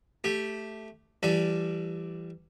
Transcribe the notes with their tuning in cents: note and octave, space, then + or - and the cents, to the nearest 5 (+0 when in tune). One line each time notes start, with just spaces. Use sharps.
A3 +0 G4 +0
E3 +30 G3 +0 A4 +0